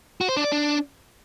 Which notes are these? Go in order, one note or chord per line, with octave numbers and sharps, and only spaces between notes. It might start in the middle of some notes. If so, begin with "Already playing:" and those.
F#4
C5
D4
D5
D4